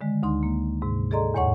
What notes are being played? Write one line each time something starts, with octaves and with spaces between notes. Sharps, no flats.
D3 D#3 G#3
D2 D#4 C6
A#3
G#2 C3
G#4 A4 D5 D#5 A#5 C6
E2 A2 C#5 F#5 C#6